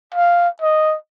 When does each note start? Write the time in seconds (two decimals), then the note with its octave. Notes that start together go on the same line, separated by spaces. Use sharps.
0.14 F5
0.61 D#5